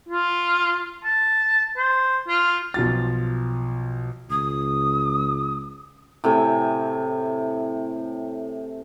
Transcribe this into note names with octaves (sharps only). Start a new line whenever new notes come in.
F4
A5
C5
F4
B1 F3 A6
C#2 D#6
A2 C3 G5 G#5